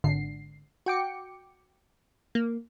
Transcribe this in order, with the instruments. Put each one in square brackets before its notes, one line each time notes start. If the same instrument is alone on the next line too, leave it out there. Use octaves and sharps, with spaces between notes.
[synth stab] G#1 D3 C7
F#4 G5 D6 C#7
A#3